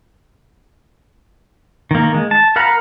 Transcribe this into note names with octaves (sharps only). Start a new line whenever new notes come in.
D#3 A#3
G#3
A5
A#4 F5 F#5 A#5 B5